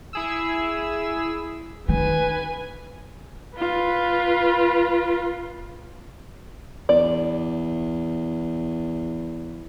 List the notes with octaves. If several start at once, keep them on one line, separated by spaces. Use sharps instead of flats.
E4 G#4 E6
D#3 B4 G#5
F4 B4
E2 D5